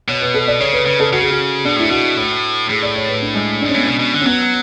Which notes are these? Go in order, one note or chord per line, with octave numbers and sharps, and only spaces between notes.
B2 C#5
B4
A4
D5
C#3 C#5
B4
C#3 B4
A4
C#3 F#4
G#4
F#4
B2 D4
A2 E4
B2 F#4
A2
A2 G#4
D5
C#5
B4
D4
G#3
D4
G#2 C#4
A2 B3
B2 C#4
B2
D3
C#4
F#3 B3